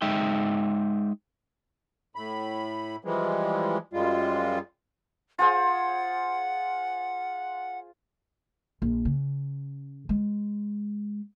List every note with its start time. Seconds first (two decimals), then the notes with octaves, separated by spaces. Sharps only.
0.02 G#3 D#4 E5 G5
2.16 A2 B5
3.05 E3 F3 G3 G#3
3.93 F#2 G3 G#3 F4
5.39 F4 G#4 C5 F#5
8.82 A#1
9.05 C#3
10.09 G#3